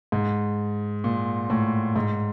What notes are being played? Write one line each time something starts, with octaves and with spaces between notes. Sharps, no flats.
G#2
A#2
A2
G#2